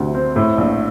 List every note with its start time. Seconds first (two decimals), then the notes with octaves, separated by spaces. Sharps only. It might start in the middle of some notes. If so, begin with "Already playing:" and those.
Already playing: D2 C3
0.15 C4
0.36 A2
0.58 A#1